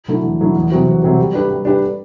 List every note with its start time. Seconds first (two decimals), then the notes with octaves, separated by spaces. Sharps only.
0.08 D3 F#3 A3 E4
0.24 E2
0.40 D3 F#3 A3 E4
0.56 E2
0.71 C3 F#3 C4 F#4
0.87 E2
1.02 C3 F#3 C4 F#4
1.18 G3
1.34 D4 G4 B4
1.49 G3
1.65 D4 G4 B4